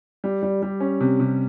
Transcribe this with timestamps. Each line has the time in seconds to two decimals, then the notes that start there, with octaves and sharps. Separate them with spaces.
0.24 G3
0.43 G3
0.62 G3
0.80 C#4
1.00 C3
1.20 C3